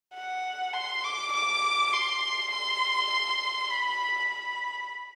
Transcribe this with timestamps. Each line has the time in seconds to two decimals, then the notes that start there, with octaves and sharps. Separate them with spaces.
0.14 F#5
0.74 C6
1.04 D6
1.33 D6
1.93 C6
2.52 C6
3.70 B5
4.29 B5